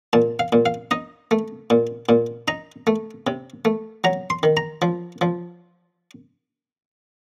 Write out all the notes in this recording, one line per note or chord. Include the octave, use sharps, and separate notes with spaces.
A#2 A5
F5
A#2
F5
D#4 D#5
A3
A#2
A#2
D#4 A#5
A3
C3
A3
F#3 A#5
C6
D#3
A#5
F3
F3